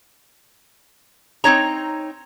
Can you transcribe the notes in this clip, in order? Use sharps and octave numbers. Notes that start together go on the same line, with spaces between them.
C4 D#4 C#5 A#5